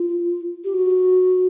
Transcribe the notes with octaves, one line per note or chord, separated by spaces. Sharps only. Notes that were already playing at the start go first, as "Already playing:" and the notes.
Already playing: F4
G4
F#4